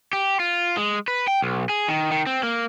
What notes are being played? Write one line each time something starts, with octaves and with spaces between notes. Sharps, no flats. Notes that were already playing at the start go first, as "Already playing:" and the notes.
G4
F4
G#3
B4
G5
B1
G#4
D#3
D#3
C4
A#3